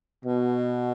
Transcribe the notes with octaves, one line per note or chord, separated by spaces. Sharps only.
B2